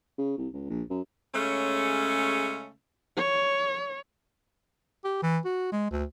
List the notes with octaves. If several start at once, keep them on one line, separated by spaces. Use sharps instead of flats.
C#3
C2
C#2
A#1
F#2
C#3 G#3 A3 C#4
C#5
G4
E3
F#4
G#3
D2